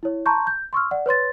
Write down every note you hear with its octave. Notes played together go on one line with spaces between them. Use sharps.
E4 C#5
A5 A#5 C6 C#6 G6
G6
C6 C#6 E6 F6
D5 F#5
B4 C#5 C6 A6